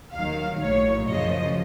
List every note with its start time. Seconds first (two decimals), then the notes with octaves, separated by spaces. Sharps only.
0.12 D#2 D#3 F#3 F5
0.59 A#1 A2 F#3 C#5
1.07 F#2 C#3 F3 D#5